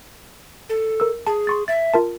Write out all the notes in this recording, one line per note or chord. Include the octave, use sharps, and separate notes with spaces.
A4
A#4 E6
G#4 A5
C6 C#6 A6
E5 A6
F4 A#4 A5